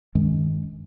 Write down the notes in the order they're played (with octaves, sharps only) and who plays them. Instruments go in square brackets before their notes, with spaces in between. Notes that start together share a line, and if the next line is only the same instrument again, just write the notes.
[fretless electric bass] G2 D#3 G#3 C#4